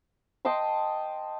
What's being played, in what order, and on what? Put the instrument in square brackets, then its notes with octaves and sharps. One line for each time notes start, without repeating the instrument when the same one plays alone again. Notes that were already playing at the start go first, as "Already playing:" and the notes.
[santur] D#5 G5 A5 C6